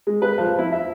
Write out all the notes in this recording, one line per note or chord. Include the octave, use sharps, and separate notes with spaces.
G#3
B4
F3
E4
E5